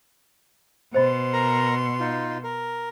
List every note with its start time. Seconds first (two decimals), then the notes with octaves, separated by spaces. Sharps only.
0.94 B2 C5 D#5 B5 C6
1.33 A#4 A#5
2.00 D#4 F4
2.44 A#4